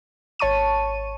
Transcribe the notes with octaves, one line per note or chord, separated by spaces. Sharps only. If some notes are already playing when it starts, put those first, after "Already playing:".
G#1 C#5 A5 C#6 D#7